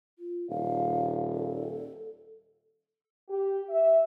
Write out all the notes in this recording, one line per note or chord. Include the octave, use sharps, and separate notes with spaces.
F4
D#1 F5
A4
G4
E5